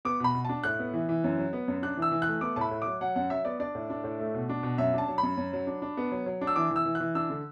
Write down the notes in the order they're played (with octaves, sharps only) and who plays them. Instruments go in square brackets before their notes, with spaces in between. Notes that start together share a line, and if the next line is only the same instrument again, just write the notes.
[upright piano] B3 D6
B2 B5
B2
D4 A5
A2 F#6
B3
E3
E3
F#2
F#3
B3
F#2
D4 F#6
E3
E6
E3
F#6
A3
B3 D6
A2 A5 B5
A2
F#3 D6
F#3 F#5
F#2 F#5
F#3 E5
B3 D5
D4 D5
A2
D4
A2
A3
B2
D4
B2
F#2 E5
D4 A5
F#3
B5
F#2
F#2
F#3
D4
D4
B3
F#3
F#3
D4
E6
E3 D6
E3
E6
E3
F#6
E3
D4 E6
D3